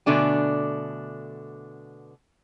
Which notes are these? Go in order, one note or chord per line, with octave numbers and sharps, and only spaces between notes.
B2 D3 A3 D4 G#5